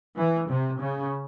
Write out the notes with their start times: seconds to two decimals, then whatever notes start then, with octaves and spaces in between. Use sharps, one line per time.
0.17 E3
0.49 C3
0.81 C#3